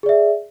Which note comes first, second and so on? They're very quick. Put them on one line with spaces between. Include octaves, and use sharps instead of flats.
G#4 D5 E5